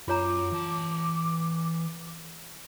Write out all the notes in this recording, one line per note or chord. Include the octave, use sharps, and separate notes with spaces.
F#2 F4 C#5 A#5 D6
E3 A5